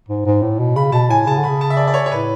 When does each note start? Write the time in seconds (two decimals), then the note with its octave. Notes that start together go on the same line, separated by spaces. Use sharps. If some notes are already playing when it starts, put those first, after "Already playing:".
0.09 G#2
0.26 G#2
0.42 A2
0.59 B2
0.76 C#3 B5
0.92 B2 A5
1.10 A2 G#5
1.27 C#3 A5
1.37 D3
1.44 C#3 B5
1.61 A5
1.70 E5
1.77 D5
1.87 D5
1.94 C#5
2.06 C#5
2.12 A2 B4